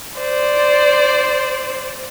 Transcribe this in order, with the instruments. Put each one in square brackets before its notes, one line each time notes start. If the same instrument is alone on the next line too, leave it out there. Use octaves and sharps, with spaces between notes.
[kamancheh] C5 D5